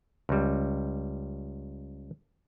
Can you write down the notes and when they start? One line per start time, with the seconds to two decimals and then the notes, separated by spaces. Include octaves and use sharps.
0.29 C#2 G3